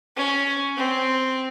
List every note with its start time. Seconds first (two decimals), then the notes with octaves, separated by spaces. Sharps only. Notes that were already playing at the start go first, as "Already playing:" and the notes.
0.16 C#4
0.76 C4